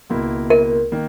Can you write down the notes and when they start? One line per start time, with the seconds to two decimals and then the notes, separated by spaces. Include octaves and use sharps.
0.10 C#2 B2 A#3 E4
0.50 A#4
0.92 D#3 A#3